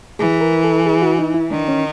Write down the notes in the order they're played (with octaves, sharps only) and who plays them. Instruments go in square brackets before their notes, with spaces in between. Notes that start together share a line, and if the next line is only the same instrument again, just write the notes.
[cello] E3 [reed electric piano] G#4
[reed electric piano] A#4
A4
G#4
F#4
D#4
E4
[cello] D#3 [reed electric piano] D4
[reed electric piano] C#4